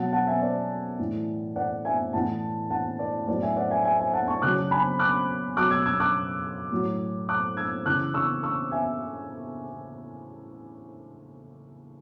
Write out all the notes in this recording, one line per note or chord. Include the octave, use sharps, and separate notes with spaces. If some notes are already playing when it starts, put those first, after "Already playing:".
Already playing: B2 F#3 F#5 A5
F#5 A5
E5 G#5
D5
A2 E3
D5 F#5
E5 G#5
A2 E3 F#5 A5
F#5 A5
D5
A2 F#3 D5
E5 G#5
D5 F#5
E5 G#5
E5 G#5
E5 G#5
F#5 A5
A5 C#6
C#3 F#3 D6 F#6
G#5 B5
D6 F#6
B2 F#3 D6 F#6
E6 G#6
E6 G#6
D6 F#6
A2 F#3
D6 F#6
E6 G#6
C#3 E3 D6 F#6
C#6 E6
C#6 E6
E5 G#5